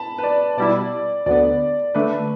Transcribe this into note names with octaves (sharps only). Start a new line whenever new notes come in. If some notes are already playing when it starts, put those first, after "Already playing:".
Already playing: A5 B5
B4
D5
B2 G3 E4 D5
D2 D3 B3 D5
D3 A3 D4 B4